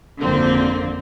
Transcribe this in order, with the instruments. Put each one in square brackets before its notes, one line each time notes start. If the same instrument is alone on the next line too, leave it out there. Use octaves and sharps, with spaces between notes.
[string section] G#1 F2 D3 A#3 C4